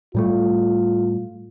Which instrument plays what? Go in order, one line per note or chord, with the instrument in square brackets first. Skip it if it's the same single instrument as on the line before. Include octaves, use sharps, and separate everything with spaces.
[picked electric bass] A2 G3 A3 [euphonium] F4